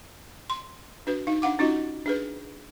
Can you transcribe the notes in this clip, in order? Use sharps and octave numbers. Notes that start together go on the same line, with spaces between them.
C6
D4 F#4 B4
D#4 F5
D4 F5 F#5 D6
C#4 D#4 F4 F#4 D#5
D4 G#4 B4